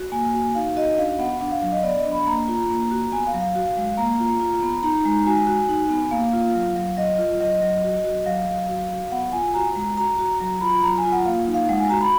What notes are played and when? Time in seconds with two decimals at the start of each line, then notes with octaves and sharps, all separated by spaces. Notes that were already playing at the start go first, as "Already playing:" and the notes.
Already playing: F#4
0.12 A#3 G#5
0.34 F#4
0.55 D#4 F5
0.76 F#4 D#5
0.98 D4 F5
1.19 B3 F#5
1.41 D4 F#5
1.51 F5
1.62 F#3 F5
1.72 D#5
1.83 B3 D5
1.98 D#5
2.04 D4
2.12 B5
2.27 A#3 A#5
2.48 F4
2.70 A#3
2.91 F#4
3.12 B3 G#5
3.27 F5
3.34 F#3
3.41 F5
3.55 F#4
3.77 G#3
3.97 A#3 A#5
4.19 F4
4.41 F4
4.62 B3
4.83 D#4 A#5
5.05 G#3
5.26 F#4 G#5
5.47 F#4
5.69 D#4
5.90 B3
6.11 A#3 F5
6.33 F4
6.55 F#3
6.75 F#3
6.97 F#3 D#5
7.18 F4
7.41 F#3 D#5
7.62 F#3
7.84 F#4
8.04 F#4
8.26 F#3 F5
8.47 F#3
8.69 F#4
8.91 F#4
9.12 B3 F#5
9.33 F4 G#5
9.50 G#5
9.54 F#4 A#5
9.76 G#3
9.97 F#4 A#5
10.19 F#4
10.40 F#3 A#5
10.61 F4 B5
10.83 F#3 A#5
10.98 G#5
11.05 F4
11.12 F#5
11.25 A#3 F5
11.47 D#4
11.54 F5
11.69 G#3 F#5
11.79 G#5
11.90 F#4 A#5
12.01 B5